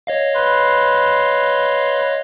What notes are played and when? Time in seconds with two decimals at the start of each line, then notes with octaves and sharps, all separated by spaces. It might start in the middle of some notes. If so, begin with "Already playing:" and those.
0.07 C#5 D#5 F5
0.35 B4 C6